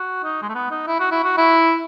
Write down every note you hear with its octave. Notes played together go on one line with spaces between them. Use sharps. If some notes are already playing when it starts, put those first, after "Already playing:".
Already playing: F#4
D#4
G#3
A3
B3
D#4
E4
F#4
E4
F#4
E4